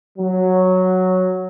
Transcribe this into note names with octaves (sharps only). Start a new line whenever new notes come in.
F#3